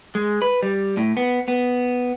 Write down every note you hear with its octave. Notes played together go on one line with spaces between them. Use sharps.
G#3
B4
G3
A2
B3
B3